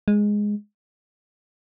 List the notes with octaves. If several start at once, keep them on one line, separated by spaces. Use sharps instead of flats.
G#3